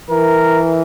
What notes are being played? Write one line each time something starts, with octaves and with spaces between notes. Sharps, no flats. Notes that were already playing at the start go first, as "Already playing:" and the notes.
E3 A#4